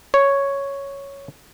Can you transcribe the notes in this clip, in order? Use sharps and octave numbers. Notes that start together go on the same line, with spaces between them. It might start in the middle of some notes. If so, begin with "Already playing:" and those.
C#5